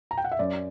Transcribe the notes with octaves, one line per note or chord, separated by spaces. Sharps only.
A#5
G5
F#5
E5
F#2 D5